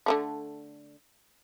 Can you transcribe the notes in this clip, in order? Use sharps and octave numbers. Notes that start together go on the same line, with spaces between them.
D3 D#3 A3